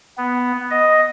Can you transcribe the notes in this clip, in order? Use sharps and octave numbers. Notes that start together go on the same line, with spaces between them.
B3
D#5